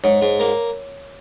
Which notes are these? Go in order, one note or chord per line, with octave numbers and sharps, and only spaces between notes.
G#2 C#5
G#2
A#3